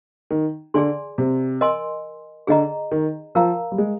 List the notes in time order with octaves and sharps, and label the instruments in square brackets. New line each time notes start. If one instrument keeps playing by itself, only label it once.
[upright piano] D#3
[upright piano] D3 [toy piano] G#4 D5 G#5 C6
[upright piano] C3
[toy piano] A#4 D#5 G#5 C6
[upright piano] D3 [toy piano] G#4 D#5 A#5
[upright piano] D#3
[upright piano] F3 [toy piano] A#4 F5 A#5
[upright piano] G3
G#3